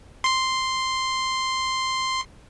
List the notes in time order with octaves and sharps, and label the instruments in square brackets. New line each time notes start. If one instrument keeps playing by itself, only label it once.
[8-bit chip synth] C6 C7